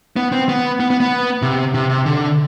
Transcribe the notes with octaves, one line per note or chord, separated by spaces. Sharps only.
B3
C4
B3
B3
B3
B3
C3
C3
C3
D3